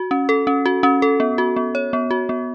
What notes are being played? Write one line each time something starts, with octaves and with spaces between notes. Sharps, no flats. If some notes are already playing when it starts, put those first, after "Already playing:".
Already playing: F#4
C#4
A4
C#4
F#4
C#4
A4
B3
F#4
B3
C#5
B3
F#4
B3